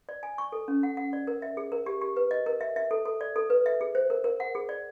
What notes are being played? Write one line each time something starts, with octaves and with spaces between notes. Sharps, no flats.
D5
G#5
C#6
A4
C#4
F#5
F#5
D5
A#4
E5
G#4
A#4
G4
G4
B4
D#5
A#4
E5
E5
A4
A4
D5
A4
B4
E5
G#4
C5
A#4
A#4
F#5
G#4
D5